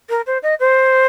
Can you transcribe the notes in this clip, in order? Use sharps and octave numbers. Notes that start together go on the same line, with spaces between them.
A#4
C5
D#5
C5